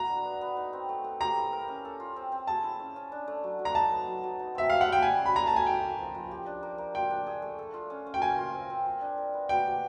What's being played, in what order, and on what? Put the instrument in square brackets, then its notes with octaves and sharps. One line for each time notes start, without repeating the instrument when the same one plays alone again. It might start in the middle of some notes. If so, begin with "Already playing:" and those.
Already playing: [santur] E4 F#4 A4 [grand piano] A#5
[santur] D4
B3
B3
D#4
C4
A3
A3
[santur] G4 [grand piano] A#5
[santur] E4
A#4
C#4
A4
F4
C4
C4
[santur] G#4 [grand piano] A5
[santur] E4
C#4
C#4
D4
A3
F#3
F#3
[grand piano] A#5
[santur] D#4 [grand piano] A5
[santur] B3
F#3
F#3
D#4
[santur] C4 [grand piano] E5
[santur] G4 [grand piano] F5
[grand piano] F#5
[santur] G3 [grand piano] G5
[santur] E4 [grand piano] G#5
[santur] C#4
[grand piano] B5
[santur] A3 [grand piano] A#5
[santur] A3 [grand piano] A5
[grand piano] G#5
[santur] D#4 [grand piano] G5
[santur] A#3
F3
F3
G4
D4
A#3
A#3
[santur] F4 [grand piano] G5
[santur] D4
G#4
A3
A4
F4
C#4
C#4
[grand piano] G5
[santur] A#4 [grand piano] G#5
[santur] F4
C4
C4
F4
D4
A#4
B3
[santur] B4 [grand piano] G5
[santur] G4